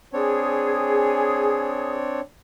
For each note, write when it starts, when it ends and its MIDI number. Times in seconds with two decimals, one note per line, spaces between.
0.13 2.20 60
0.13 2.20 62
0.13 1.94 68
0.13 2.20 73